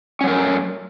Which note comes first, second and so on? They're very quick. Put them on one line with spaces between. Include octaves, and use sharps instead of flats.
C#4 F#3 A#4 A3